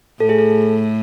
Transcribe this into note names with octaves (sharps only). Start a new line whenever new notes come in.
A2 A4
G#4
A4